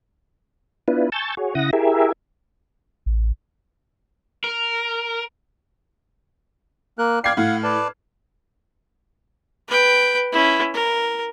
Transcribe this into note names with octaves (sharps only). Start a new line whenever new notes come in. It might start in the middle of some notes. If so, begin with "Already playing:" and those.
B3 D4 E4 F4 B4
G#5 A5 C#6 E6 G6 A6
F#4 G#4 C#5
C#3 E4 F#5 D#6 A#6
E4 G4 G#4 A#4 E5
A1
A#4
A#3 A#4 F#6
D5 F5 G5 F6 G#6 C7
A2 F5 F#5
B4 D5 A5
B4 G5
C#4 E4
A#4